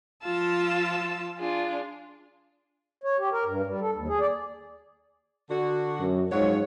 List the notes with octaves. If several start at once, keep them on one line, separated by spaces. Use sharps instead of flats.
F3 F4 A5 E6
D4 F4 G#4
C#5
G4
A#4
G2
G3
A4
D#2
G#4
D5
D3 F#4
F#2
G#2 F3 F#3 C#5